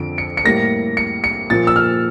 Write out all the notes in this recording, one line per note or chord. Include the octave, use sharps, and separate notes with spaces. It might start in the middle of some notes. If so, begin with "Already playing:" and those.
Already playing: F2 D3 F3 D7
C#7
C#7
A2 G3 A#3 A#6
C#7
C#7
A#2 F3 A#3 A6
E6
F6